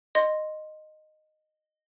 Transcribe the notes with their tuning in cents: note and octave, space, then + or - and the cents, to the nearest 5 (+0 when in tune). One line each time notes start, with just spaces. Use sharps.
D#5 -10 C6 +0